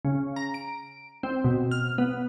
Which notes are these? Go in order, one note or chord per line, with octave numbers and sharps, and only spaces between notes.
C#3
A#5
D7
C4
B2
F6
B3